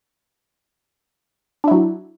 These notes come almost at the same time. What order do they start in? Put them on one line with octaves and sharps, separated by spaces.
D4 E4 F#3